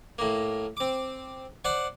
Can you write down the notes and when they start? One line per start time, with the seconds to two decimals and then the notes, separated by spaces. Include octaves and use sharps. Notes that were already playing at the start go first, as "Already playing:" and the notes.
0.18 A2 A#3
0.77 C4 D6
1.65 C5 D5 F#5